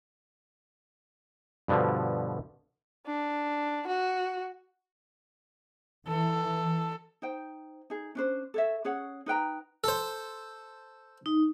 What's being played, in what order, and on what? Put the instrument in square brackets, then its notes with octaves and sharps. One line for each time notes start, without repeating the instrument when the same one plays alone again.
[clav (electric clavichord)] G2 B2 D3 F3
[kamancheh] D4
F#4
[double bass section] E3 [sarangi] A4
[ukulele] D#4 C5 G5
D#4 G#4
C#4 D4 C5
A4 C#5 E5
C#4 G#4 C#5 F#5
D#4 B4 G5 A#5
[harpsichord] A4 C5
[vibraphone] D#4